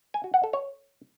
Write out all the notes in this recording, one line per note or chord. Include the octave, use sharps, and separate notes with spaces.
G#5
F#4
F#5
A4
C#5